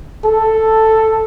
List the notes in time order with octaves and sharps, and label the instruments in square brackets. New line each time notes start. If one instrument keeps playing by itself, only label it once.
[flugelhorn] A4